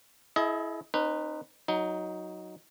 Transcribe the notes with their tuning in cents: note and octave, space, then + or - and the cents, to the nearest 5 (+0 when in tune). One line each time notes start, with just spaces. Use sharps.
E4 +0 G#4 +45 D#5 +25
C4 +40 D#4 -25 B4 +0
F#3 +0 D#4 +10